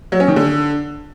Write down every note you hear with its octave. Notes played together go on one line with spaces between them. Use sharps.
F#3
C#4
D#3
D3